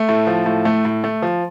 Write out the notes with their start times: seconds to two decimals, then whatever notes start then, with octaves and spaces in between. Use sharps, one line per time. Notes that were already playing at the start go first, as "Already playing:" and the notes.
Already playing: A3
0.09 A2
0.27 F3
0.46 A2
0.65 A3
0.85 A2
1.04 A3
1.22 F3